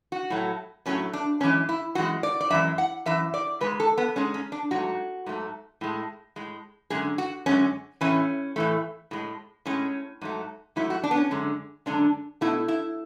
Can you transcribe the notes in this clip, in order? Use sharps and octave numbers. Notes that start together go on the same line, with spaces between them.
F#4
A2 F#3 A3
A2 F#3 A3 C#4
D4
F#2 E3 G#3 C#4
E4
F#2 E3 G#3 F#4
D5
D5
F#2 E3 G#3 E5
F#5
F#2 E3 E5
D5
G#2 G#3 B4
A4
B3
G#2 G#3 C#4
C#4
D4
G#2 F#3 A3 F#4
G#2 F#3 A3
A2 G#3
A2 G#3
F#2 D3 G#3 G#4
F#4
F#2 D3 G#3 C#4
A2 E3 A3 C#4
A2 E3 A3
A2 G#3
A2 G#3 C#4
G#2 F#3 A3
G#2 F#3 A3 E4
F#4
D4
B3
C#4
F#2 D3 G#3
F#2 D3 G#3 D4
B2 A3 E4
E4